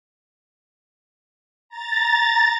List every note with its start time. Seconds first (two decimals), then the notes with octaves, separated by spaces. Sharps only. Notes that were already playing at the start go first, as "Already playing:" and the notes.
1.69 A#5 A6